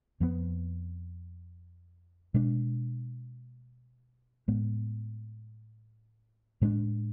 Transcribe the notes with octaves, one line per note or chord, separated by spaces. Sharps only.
F2 F3 G#3 B3
B2 G#3 D4
A2 G#3 B3
A2 G#3 B3 D4